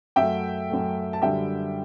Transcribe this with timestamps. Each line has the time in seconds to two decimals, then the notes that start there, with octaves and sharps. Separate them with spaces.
0.16 F#2 F#3 A3 E5 G5
0.70 F#2 F#3 A3
1.13 A5
1.22 F#2 D3 G3 E5 G5